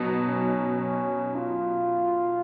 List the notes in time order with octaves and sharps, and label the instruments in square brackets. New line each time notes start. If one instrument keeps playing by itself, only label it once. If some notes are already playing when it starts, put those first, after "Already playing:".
Already playing: [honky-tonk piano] B2 F#3 D#4 [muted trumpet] B3
[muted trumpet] C#4
C#4
F4